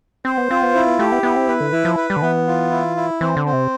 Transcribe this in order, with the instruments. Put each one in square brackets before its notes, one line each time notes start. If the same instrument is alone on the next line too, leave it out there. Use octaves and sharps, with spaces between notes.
[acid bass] C4 [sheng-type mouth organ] C5
[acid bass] B3
[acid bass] C4 [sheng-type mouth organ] F4
[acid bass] B3
[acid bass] C4 [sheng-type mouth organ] E4
[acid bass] B3
[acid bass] A3 [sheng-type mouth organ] G4
[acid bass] B3
[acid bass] B3 [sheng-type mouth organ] E4
[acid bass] C4
[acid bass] B3 [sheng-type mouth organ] B4
[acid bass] D3
[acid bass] E3 [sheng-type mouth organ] E4
[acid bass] F3
[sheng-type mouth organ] B4
[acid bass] G3
D3
[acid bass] E3 [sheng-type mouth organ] B3
[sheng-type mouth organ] F4
E4
E4
[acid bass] E3 [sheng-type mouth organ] C4
[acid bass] D3
[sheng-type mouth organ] C4
[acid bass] C3